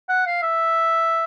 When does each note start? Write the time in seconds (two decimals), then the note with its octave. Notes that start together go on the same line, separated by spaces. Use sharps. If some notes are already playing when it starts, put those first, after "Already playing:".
0.09 F#5
0.26 F5
0.42 E5